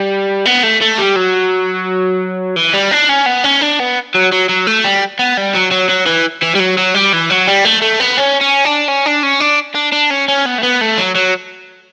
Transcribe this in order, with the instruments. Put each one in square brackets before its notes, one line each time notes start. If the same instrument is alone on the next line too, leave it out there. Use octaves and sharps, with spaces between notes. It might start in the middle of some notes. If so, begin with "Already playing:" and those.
Already playing: [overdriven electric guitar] G3
B3
A3
A3
G3
F#3
E3
G3
D4
C#4
B3
C#4
D4
B3
F#3
F#3
F#3
A3
G3
B3
G3
F#3
F#3
F#3
E3
E3
G3
F#3
F#3
G3
E3
F#3
G3
A3
A3
B3
C#4
C#4
D4
C#4
D4
C#4
D4
D4
D4
C#4
C#4
B3
A3
B3
A3
F#3
F#3